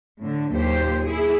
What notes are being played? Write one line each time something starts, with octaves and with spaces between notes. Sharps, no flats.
A2 D3
D#2 A#2 F#3 G4 C5
E4 G#4